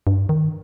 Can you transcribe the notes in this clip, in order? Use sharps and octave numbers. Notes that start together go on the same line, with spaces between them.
G2
D#3